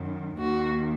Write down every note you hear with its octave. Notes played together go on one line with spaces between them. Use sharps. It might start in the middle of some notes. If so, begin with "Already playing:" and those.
Already playing: F#2 D#3
D#2 D#3 F#4